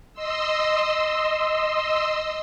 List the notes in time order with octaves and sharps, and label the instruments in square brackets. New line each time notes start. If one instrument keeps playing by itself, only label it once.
[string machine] D#5 C6 E6